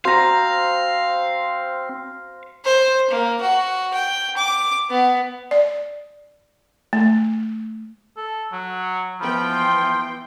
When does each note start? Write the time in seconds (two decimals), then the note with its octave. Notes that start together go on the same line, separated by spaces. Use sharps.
0.05 C4 F#4 C5 F5 A#5
2.65 C5
3.10 A#3
3.41 F#4
3.94 G5
4.37 D6
4.90 B3
5.51 D5
6.93 A3
8.17 A4
8.52 F#3
9.21 E3 F3 B3 G5 B5
9.51 C6